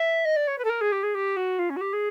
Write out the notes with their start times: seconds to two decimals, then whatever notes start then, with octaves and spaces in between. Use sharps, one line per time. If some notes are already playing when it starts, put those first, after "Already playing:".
Already playing: E5
0.25 D#5
0.36 D5
0.47 C#5
0.58 B4
0.64 A4
0.69 A#4
0.81 G#4
0.92 G4
1.03 G#4
1.14 G4
1.36 F#4
1.59 F4
1.69 C#4
1.76 F#4
1.81 G4
1.93 G#4